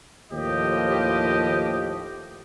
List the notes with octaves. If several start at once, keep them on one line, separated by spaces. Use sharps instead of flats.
D#2 A2 F3 G4 D#5